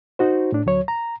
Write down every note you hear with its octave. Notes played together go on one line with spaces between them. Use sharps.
D#4 F#4 C5
A2 D4
D2 F#3 C#5
A#5